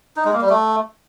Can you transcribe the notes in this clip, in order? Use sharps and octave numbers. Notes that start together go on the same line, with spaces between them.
D#4
G#3
A#3
G3
A3